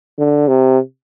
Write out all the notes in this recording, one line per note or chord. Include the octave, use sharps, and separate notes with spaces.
D3
C3